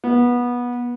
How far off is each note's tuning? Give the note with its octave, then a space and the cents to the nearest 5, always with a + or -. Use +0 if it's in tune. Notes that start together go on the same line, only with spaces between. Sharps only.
B3 -20